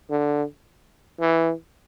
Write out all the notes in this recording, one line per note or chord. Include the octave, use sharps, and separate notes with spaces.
D3
E3